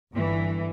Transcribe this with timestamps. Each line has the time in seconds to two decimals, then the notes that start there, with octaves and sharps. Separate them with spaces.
0.14 G1 G2 E3